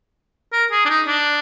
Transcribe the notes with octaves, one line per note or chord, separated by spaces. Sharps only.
A#4
G#4
D4
D#4
D4